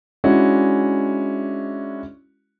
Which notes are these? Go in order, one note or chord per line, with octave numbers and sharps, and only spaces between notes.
G#3 C#4 D4 E4 F#4